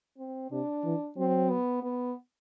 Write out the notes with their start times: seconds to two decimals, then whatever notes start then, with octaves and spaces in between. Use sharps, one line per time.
0.18 C4
0.51 C3 D4
0.84 E3
1.17 F#3 C4
1.50 B3
1.83 B3